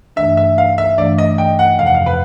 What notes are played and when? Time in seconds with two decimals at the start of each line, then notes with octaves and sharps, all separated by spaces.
0.16 G2 E3 A3 D4 E5
0.37 E5
0.58 F5
0.78 E5
0.98 G2 E3 A3 D4 D5
1.18 D#5
1.38 G5
1.59 F#5
1.79 F2 C3 F3 F5
1.86 F#5
1.94 F5
2.06 B4